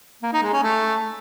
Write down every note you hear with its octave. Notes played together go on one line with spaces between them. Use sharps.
A#3
D#4
G#3
C#4
A3